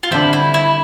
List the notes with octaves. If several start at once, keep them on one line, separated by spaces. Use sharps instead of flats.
F4
D3 G3 C4 E4
E4
E4